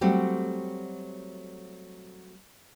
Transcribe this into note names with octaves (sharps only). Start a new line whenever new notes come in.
F#3 G3 A3 C4 F#4